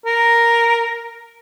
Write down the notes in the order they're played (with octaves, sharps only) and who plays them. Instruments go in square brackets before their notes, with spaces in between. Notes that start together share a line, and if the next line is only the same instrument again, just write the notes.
[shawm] A#4